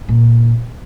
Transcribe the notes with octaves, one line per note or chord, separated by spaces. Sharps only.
A#2